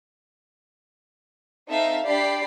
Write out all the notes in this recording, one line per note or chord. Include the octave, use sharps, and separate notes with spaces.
C4 D#4 A4 E5 F5
D4 G4 D5 B5 C7